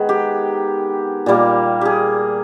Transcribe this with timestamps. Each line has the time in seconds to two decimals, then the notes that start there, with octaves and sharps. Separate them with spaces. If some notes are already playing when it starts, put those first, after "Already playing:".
Already playing: D#3 G#3 B3 B4
0.09 G4
1.26 A#2 G3 A#3
1.81 G4 G#4